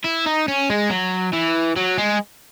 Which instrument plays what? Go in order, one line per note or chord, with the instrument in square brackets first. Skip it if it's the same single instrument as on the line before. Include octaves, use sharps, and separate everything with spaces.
[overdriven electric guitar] E4
D#4
C#4
G#3
F#3
E3
F#3
G#3